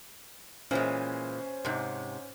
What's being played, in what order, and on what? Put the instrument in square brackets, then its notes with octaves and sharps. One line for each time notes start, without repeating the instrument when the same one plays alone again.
[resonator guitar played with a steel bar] A#2 E3 G#3 [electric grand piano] C#4 C5
[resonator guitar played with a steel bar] G#2 C3